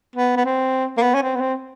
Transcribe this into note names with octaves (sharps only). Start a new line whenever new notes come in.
B3
B3
C4
A#3
B3
C#4
C4
B3
C4